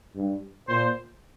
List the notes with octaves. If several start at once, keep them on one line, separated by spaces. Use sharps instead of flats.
G2
A#2 C5